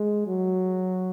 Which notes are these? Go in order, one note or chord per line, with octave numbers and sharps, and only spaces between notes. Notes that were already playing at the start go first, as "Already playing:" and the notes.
Already playing: G#3
F#3